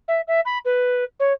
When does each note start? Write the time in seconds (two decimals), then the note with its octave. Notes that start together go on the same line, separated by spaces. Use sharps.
0.08 E5
0.28 E5
0.45 B5
0.65 B4
1.20 C#5